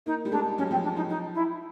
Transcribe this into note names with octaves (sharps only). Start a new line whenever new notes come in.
A#3 D#4
G3
G#3 D4
F#3 C#4
F3 C4
D4
F3 D#4
D#4
E4